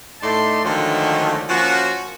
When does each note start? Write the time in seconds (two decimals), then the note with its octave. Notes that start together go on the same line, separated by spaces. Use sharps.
0.21 A2 A3 D#4 D5 A5 C6
0.64 D3 D#3 F3 F#3 G#3 A3
1.50 F3 A#3 C#4 F#4